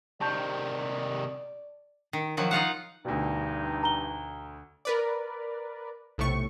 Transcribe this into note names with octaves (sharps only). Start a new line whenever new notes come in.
C3 D#3 D5 A5 C#6 G6
D#3
D#3 F3 F#3
D#4 F4 F5 F#5
D2 G2 B2 D#4
A#5 G7
A#4 B4 D5
B1 A2 C3 A3 C#6